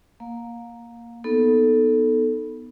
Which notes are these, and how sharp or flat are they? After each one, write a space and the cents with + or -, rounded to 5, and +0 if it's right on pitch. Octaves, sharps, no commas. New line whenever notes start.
A#3 +0 F5 +30
B3 -5 D#4 +0 A4 +0